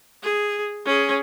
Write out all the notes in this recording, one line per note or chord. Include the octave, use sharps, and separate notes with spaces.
G#4
C#4 G#4